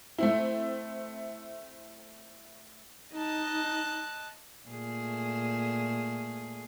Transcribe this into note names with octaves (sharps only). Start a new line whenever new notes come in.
A3 C4 E4
D#4 D#5 A5 F#6
A#2 A3 G#4